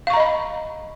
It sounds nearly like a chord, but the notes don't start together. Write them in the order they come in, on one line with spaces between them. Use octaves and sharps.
F5 C#6 A#5 D#5 B5